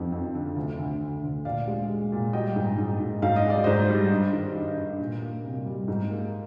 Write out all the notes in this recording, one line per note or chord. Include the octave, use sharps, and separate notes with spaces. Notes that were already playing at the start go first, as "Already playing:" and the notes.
Already playing: F2 D#3 F3
F2
D3
D2
D2
D3
D2
A#2 D5 F5
G#3
G#3
A#2
G3 D#5 G5
G#2
G#2
G#2
G#2 F5
D#5
G#2
D5
G#2 C5 D#5
G3
G2
D#3
G2
G2
A#2
A#3
C2
G3
G#2
A#3